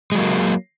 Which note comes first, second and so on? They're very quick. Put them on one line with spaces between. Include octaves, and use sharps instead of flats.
G#3 F#3 A#3